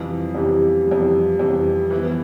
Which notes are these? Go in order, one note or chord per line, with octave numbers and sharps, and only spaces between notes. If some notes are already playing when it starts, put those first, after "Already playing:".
Already playing: F2 C3 E3 G3
F2 C3 E3 G3
F2 C3 E3 G3
F2 C3 E3 G3
E3 B3 E4